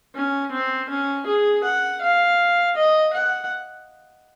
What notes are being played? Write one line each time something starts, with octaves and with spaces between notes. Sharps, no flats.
C#4
C4
C#4
G#4
F#5
F5
D#5
F#5